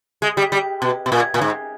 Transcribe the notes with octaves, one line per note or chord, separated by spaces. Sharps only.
G#3
G3
G3
B2
B2
A#2
A#2
G#2